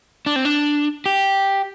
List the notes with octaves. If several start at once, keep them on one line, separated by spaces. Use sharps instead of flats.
D4
C4
D4
G4